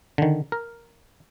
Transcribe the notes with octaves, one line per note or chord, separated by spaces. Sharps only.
D3 D#3
A#4